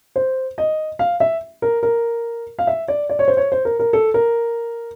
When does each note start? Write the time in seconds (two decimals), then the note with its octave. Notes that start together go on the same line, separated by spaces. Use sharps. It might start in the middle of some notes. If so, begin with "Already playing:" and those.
0.16 C5
0.58 D#5
0.99 F5
1.20 E5
1.62 A#4
1.83 A#4
2.59 F5
2.67 E5
2.88 D5
3.10 D5
3.19 C#5
3.28 C5
3.37 C#5
3.52 C5
3.65 A#4
3.79 A#4
3.93 A4
4.14 A#4